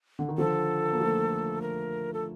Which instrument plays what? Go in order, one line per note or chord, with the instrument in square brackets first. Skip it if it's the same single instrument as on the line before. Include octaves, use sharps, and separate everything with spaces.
[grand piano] D3
D#3
[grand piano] D3 F3 [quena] A4
[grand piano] A#3
F3 A3
[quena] A#4
A4